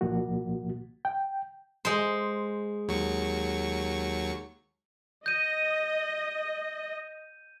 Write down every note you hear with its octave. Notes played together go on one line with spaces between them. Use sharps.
C2 A#2 F3 A#3 F#4
G5
G#3 C5
D#2 F#3 C#6
D#5 G6 D#7